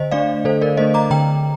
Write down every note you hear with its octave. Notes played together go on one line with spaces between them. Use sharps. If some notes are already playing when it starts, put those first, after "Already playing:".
Already playing: D3 C5 D#5
A3 D4 D5 F5
D3 A4 C5
A#4 D5
A3 D4 C5 D#5
A#5 D6
D3 G5 A#5